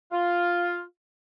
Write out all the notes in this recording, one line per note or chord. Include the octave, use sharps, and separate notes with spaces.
F4